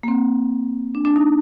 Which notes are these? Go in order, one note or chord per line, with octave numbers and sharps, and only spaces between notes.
A#3
C4
D4
D4
D#4